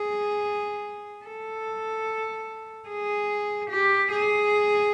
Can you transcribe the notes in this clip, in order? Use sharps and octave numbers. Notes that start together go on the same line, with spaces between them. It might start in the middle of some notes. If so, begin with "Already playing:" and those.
Already playing: G#4
A4
G#4
G4
G#4